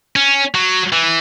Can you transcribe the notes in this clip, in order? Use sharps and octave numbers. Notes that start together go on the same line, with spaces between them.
C#4
F#3
E3